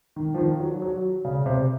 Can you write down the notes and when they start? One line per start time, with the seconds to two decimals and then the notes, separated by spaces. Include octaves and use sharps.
0.16 D#3
0.34 F3
0.38 D#3
0.60 F#3
0.82 F#3
1.25 C#3
1.46 C3